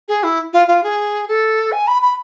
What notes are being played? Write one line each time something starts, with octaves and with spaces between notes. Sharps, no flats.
G#4
E4
F4
F4
G#4
A4
G#5
B5
B5